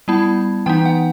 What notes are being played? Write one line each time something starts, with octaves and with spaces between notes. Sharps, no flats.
G3 B3 E4 A5
E3 B3 D#4 G5
F#5